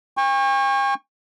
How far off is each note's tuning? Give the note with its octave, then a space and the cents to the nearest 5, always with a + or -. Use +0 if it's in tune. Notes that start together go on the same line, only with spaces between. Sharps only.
G5 +45 C#6 -20